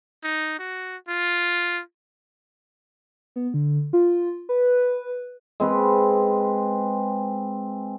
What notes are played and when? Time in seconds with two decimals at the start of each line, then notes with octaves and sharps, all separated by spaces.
0.24 D#4
0.59 F#4
1.09 F4
3.36 B3
3.54 D3
3.93 F4
4.49 B4
5.60 G#3 C4 B4 B5